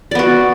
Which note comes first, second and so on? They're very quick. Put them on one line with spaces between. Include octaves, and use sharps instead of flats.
D5 B3 F#4